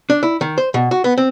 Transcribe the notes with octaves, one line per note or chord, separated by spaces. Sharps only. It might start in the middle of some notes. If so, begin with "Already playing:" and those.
D4
E4
D#3
C5
B2
F#4
B3
C4